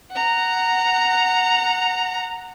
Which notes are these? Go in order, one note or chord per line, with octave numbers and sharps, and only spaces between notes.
F#5 A#5